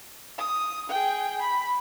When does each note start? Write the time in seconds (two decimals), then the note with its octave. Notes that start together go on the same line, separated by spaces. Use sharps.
0.38 D#6
0.89 G#4 G5
1.41 B5